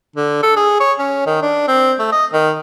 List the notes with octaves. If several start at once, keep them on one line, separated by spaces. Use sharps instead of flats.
D3
A4
G#4
C#5
C#4
D#3
D4
C4
A3
D#5
D#3